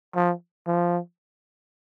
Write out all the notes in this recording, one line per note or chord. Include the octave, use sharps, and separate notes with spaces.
F3
F3